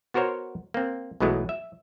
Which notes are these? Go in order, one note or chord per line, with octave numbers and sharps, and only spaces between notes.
B3 F#4 A#4 C5 C#5
A#3 C4
B1 B2 E3 F#3 G#3 A3
E5